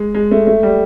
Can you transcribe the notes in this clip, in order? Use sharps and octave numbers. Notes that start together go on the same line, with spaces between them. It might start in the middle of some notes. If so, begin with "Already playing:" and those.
Already playing: G#3
G#3
A3
A3
G3